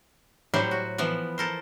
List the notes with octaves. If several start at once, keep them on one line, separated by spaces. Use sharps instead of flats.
A2 F#3 G3 E4 G4 C5
F#4
E3 F3 B3
A4 A#4 C5